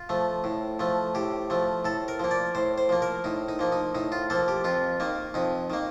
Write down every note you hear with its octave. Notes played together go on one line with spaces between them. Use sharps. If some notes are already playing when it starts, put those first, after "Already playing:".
Already playing: F4
F3 A3
A2
F3 A3
A2 G4
F3 A3
A2 A4
A#4
F3 A#3
D5
A2 C5
C5
F3 A#3
A#4
A2 D#4
D#4
F3 A#3
D#4
A2 D#4
F4
F3 A#3 A4
G4
F2 F4
D#3 A#3
F2 D#4
D#3 A#3